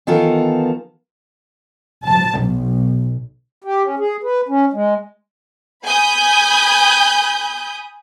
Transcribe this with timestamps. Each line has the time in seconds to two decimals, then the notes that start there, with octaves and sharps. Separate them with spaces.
0.07 D#3 E3 B3 F4 A4 A#4
2.05 A5
2.40 B1
3.64 G4
3.83 C#4
3.99 G#4
4.23 B4
4.49 C#4
4.73 G#3
5.85 G#5 B5 D#6 G6